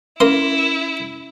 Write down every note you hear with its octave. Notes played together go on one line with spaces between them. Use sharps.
A#3 C#4 E4 A#4 C6